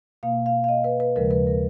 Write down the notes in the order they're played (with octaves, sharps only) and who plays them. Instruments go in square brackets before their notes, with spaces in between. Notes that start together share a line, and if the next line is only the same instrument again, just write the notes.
[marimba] B2 A#3 F5
F5
F5
D#5
B4
B4
D#2 C#3 F3 G#3 A#4
B4
A#4